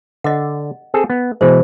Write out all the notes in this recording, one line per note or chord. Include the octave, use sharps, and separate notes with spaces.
D3 D#5 F#5
C4 G#4 A4
B3
B2 E3 G#3 C5